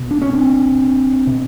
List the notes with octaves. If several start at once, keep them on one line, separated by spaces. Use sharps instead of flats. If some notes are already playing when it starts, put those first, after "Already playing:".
Already playing: B2
D4
C#4
C4 D4
B2